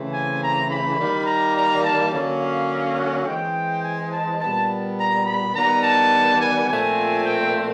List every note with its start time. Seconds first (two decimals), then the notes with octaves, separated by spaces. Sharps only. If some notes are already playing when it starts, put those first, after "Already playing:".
Already playing: C#3 E3 A3 C4
0.13 G#5
0.42 A#5
0.70 B5
0.99 D#3 G3 A#3
1.26 A#5
1.56 A#5
1.84 A5
2.12 D3 F#3 A#3 C#4
2.40 F5
2.98 F#5
3.26 E3 G#3 C4 G5
3.84 G#5
4.12 A5
4.40 A#2 G3 B3 A5
4.98 A#5
5.26 B5
5.54 D#3 G3 B3 A#5
5.83 A5
6.41 G#5
6.70 A#2 F3 A3 C4 G#5
7.26 G5